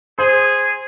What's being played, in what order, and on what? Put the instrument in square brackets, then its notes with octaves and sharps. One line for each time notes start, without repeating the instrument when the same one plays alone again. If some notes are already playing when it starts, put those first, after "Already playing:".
[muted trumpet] G#4 [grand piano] C5